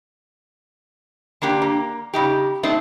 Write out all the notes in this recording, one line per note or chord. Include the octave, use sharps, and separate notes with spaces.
D3 A#3 D4 G4
A#3
C#3 D#4 G4
A3 C4 D4 D#4